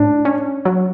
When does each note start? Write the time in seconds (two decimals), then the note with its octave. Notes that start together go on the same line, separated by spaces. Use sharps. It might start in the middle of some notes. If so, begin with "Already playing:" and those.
Already playing: A2 D4
0.25 C#4
0.65 F#3